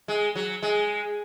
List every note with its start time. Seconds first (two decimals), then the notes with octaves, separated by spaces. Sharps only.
0.08 G#3
0.35 F#3
0.63 G#3